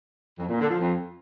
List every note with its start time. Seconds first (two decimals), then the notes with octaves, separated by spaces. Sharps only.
0.39 F2
0.49 A#2
0.59 D3
0.69 F3
0.80 F2